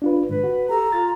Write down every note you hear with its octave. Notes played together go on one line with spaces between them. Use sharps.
D4 F4 B4
G#2 D3 B4
F#4
G4 A4 A#5
F4 A6